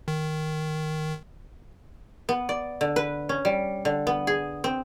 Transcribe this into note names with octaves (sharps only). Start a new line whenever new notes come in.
D#3
B3
D5
D3
B4
C#4
G3
D3
B3
G#4
C4